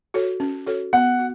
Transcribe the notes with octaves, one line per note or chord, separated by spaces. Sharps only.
F#4 A4 C#5
C#4
F#4 A4 C#5
B3 F#5
F#4